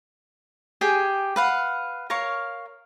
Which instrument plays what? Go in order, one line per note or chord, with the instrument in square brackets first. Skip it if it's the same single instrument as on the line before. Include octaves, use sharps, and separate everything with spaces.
[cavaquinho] G4 G#4 G5 G#5
B4 F5 F#5
A#4 C#5 F5 C#6